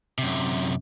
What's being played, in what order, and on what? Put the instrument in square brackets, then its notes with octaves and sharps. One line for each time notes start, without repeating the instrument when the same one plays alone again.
[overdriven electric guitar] F#2 C3